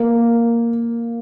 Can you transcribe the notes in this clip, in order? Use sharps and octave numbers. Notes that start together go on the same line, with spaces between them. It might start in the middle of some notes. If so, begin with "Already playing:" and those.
Already playing: A#3